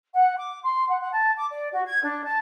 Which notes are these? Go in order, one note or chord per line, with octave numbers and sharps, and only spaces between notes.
F#5
D6
C6
F#5
F#5
A5
D6
D5
F#4
G#6
D4
A5